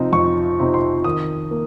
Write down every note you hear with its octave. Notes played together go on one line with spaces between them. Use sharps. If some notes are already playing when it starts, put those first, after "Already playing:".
Already playing: C3 F3 C4 D#4
F2 C#6
C3 F3 C4 D#4
C6
D#3 D#6
A#3